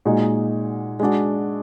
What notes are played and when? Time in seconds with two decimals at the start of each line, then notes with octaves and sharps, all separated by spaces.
0.05 A#2 G#3 D#4 F#4
1.00 G#3 D4 F#4